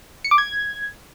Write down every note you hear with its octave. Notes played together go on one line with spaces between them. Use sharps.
C#7
D6
G#6